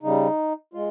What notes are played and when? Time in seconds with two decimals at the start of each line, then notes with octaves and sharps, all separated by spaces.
0.03 C#3 G3 D#4
0.74 G#3 F4